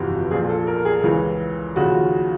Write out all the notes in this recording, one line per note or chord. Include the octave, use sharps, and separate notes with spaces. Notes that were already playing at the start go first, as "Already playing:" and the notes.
Already playing: G1 F2 C3 E3 F#4 G4
A#1 A#2 F3 G#4
A4
A#4
G#4
C#2 C#3 E3
D#2 C#3 F3 F#4